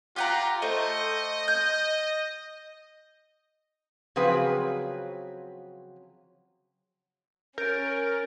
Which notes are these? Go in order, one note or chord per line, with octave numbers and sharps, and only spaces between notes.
F4 G4 F#5 A#5
A3 C5 D#5
G6
C#3 F3 F#3 C4 G#4 B4
C#4 A#4 G6 A6 D7